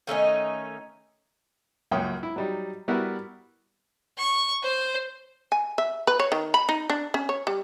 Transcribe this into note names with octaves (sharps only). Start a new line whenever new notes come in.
D#3 A3 C#4 D#4
C#2 F#2 A#3 C#5 G5 D#6
E4
F#3 G3 D#4
G3 B3 E4 F#4 A#4 B4
C#6
C5
G#5
E5
B4
C#5
D#3
B5
D#4
D4
C#4
C#5
G3